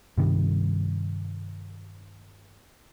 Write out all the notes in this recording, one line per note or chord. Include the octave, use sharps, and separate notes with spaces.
G2 C3 D#3 G3